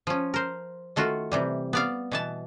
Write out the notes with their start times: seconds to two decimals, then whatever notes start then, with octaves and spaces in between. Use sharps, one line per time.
0.07 F3 C#4
0.34 A#4 C5
0.96 D#3 A3 F4 F#4
1.32 C3 E3 G3
1.73 B3 D5 F5
2.11 B2 E3 A5